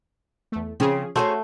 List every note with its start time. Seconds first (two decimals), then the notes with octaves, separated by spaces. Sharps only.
0.52 E2 A3
0.80 C#3 F3 C4 C#4 G#4
1.16 A3 C#4 F#4 G#4 C5